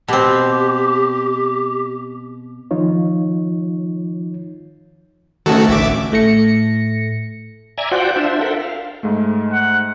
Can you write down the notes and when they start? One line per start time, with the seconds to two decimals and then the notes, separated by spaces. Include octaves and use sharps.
0.08 B2 C4 G4
2.71 D#3 F3 D#4 F4 C#5
5.46 D2 D#3 C#4 F#4 A4 C#5
5.69 A1 E5 D6
6.12 A2 A3 A#6 C#7
7.78 D5 E5 G#5 A#5
7.92 F4 F#4 C5 D5 F#5 G5
8.16 D4 F4 C5 E5
8.41 A4 A#4 E5 F#5 G5
8.60 F5
9.03 G#2 G#3 A3
9.52 F#5